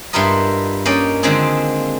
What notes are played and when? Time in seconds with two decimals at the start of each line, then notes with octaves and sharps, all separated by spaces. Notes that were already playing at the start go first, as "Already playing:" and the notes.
0.13 G2 G3 E4 F4 A#4 D#5
0.85 A#3 C#4 D5 D#5 G5
1.23 D3 D#3 F3 G#3 C4 G#4